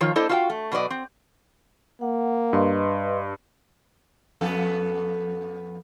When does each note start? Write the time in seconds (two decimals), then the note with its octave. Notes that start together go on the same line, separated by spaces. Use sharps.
0.01 D#3 F3 F4 C#5
0.16 A#3 D4 E4 A4 C5 D#5
0.29 F4 F#4 B4 E5 F5 G5
0.50 A3
0.72 B2 F#3 B4 D5 D#5
0.90 C4
2.01 A#3 F#5
2.53 G2 B4 D#5 C6
4.41 F2 B3 A4